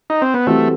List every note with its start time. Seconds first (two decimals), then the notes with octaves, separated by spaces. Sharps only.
0.10 D#4
0.22 C4
0.34 B3
0.47 E3 G3 A3 C4 F#4 A4